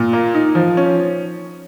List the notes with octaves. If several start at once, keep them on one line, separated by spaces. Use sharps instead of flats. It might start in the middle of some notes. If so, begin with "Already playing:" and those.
Already playing: A#2
A#3
D#4
F3
C#4